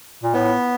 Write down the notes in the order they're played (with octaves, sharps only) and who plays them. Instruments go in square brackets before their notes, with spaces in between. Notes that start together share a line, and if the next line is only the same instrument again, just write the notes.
[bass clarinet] A#2
[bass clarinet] A2 [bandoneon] B3